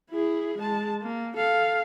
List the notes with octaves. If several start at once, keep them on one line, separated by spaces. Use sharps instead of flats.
E4 G#4
G#3 A5
A#3
A4 F5